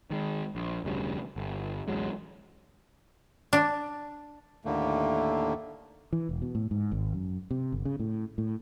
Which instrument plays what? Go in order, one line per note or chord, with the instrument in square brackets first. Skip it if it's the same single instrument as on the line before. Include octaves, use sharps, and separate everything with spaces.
[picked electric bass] D#3 G#3
A#1
F1 D2 C#3 G3
G1
A1 D2 F#3 G#3
[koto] D4
[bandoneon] D#2 A2 D3 A3 A#3
[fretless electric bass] E3
E1
B2
A2
G#2
G#1
F#2
C3
G1
C#3
A2
A2